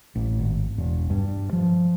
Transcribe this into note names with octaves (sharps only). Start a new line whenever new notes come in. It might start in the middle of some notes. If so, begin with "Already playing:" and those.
A1
G#1
E1
G2
F3